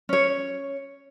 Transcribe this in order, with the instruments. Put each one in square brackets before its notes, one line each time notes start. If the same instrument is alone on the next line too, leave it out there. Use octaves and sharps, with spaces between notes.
[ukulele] C#4 C#5